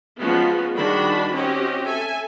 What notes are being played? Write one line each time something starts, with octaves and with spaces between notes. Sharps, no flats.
F3 G#3 B3 C#4 F4 F#4
D#3 G3 D4 F#4 G#4 B5
C4 C#4 F#4 G4 D#5
A4 E5 G#5